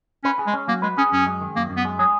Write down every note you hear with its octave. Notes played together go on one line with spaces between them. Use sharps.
C#4 B4
G#4
G#3
C#4
F#3 A#3
G#3 B4
C#4 G#4
F#2 C#4
G#3
D#3
F#2 A#3
F#2
B3
G#3
F#3 G#4